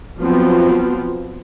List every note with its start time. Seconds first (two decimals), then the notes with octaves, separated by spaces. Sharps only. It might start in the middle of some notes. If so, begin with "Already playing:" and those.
0.20 F3 F#3 B3 C4 F4